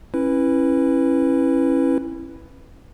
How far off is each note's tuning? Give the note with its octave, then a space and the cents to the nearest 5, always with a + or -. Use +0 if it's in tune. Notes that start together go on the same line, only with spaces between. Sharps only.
C#4 -35 E4 +0 B4 +0